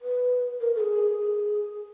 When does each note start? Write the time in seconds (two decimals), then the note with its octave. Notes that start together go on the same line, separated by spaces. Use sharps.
0.01 B4
0.60 A#4
0.76 A4
0.80 G#4
1.20 G#4